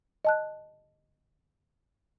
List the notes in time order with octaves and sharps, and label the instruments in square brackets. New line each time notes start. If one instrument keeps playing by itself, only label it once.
[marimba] D#5 A5 F#6